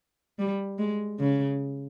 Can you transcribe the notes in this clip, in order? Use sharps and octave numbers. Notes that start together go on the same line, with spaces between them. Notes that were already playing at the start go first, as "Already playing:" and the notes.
G3
G#3
C#3